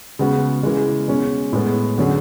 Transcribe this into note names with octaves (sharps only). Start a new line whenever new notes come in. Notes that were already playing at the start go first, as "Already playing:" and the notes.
C#3 G#3 B3 F#4
C#3 E3 G#3
B2 G#3 C#4
A2 G#3 B3
D3 F#3 C#4 G#4